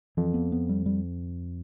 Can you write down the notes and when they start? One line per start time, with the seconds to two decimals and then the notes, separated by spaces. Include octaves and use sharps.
0.17 F2 E3
0.34 B3
0.52 B3
0.69 G3
0.86 G3